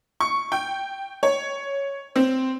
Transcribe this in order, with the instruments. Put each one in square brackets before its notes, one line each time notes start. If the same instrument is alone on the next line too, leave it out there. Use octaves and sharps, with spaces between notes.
[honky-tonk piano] C#6
G5
C#5
C4